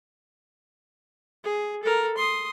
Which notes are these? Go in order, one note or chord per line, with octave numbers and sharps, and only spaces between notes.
G#4
A4 A#4
C6 D#6